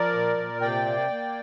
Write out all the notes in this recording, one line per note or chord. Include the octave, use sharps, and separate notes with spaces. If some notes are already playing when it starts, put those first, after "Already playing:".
Already playing: F3 A#4 D5
A#2
A#2
C3 D5 G5
A#3
A#3